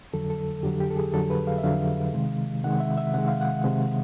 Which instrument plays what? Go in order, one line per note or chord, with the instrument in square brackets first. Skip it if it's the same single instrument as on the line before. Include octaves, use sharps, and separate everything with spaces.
[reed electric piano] F2 D3 F#3 A4
A4
F2 D3 F#3 G4
G4
A4
G#4
F2 D3 F#3 A4
B4
F5
E5
F2 D3 F#3 F5
C3 D#3 G#3
C3 D#3 G#3 F#5
E5
E5
C3 D#3 G#3 F#5
F5
F#5
C3 D#3 G#3